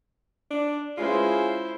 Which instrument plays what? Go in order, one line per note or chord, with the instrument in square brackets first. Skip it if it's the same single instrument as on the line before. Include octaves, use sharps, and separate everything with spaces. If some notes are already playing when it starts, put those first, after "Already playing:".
[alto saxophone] D4
[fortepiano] G#3 C#4 B4 [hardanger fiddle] E4 C5 [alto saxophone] F4 [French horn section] G#4